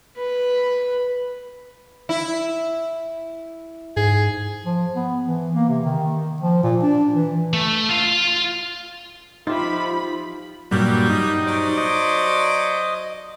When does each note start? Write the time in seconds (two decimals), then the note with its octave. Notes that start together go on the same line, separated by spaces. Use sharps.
0.17 B4
2.09 E4
3.97 G#2 G#4
4.65 F3
4.95 B3
5.27 E3
5.55 A#3
5.68 C3
5.84 D#3
6.41 F3
6.63 A#2
6.82 D4
7.14 E3
7.53 A3
7.89 F4 F5
9.47 F3 D#4 F4 G4 E5 B5
10.71 G2 A#2 F#3 G3
11.09 D#4
11.47 F#3 C5 D5
11.77 D#5